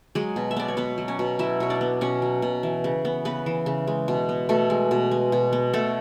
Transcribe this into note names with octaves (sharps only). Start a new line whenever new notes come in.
F#3 G#3 G#4
B2
E5
B3 D5
C#5
B2 B3 B4
F#3
C#4 C#5
B2
F#3 E4 E5
B2 C#5
D4 D5
B3
B2 C#4 C#5
F#3
B2
E3
C#3
B3
C#3 B3 B4
E3
C#3
G#3
B2
B3
B2 A3 A4
G#3
B2
G#3
B2
B3
B2 A3 A4